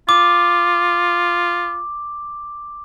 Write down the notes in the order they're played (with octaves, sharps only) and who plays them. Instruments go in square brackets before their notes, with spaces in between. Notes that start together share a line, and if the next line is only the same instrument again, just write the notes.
[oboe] F4 [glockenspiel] D6